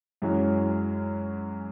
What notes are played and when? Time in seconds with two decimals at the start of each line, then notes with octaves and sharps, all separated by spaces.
0.22 F#2 E3 G#3 C#4 F#4